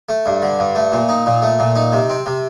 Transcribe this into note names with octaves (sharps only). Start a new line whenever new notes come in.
A3
G2
D3
G2
A3
A#2
D#4
A#2
A3
A#2
D#4
C3
C4
C3